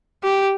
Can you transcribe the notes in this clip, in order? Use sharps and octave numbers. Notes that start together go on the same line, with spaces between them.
G4